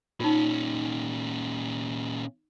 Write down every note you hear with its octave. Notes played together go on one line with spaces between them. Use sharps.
A#2 C#4 D#4 F4